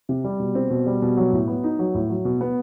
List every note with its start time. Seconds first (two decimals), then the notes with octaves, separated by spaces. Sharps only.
0.09 C3
0.24 G3
0.40 B2
0.55 C4
0.70 B2
0.86 G3
1.02 B2
1.17 F#3
1.33 A2
1.48 B3
1.64 D#4
1.79 F#3
1.95 A2
2.10 F#3
2.25 B2
2.41 B3